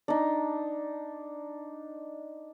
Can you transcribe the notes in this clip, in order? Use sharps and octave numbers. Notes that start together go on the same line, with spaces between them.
D4 D#4